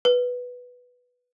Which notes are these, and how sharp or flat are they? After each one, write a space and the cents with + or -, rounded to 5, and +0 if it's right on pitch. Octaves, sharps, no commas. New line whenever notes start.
B4 -5